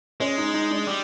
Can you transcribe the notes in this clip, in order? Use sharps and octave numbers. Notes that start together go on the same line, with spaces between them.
G#3 C#4
D#4
D#4
D4
G3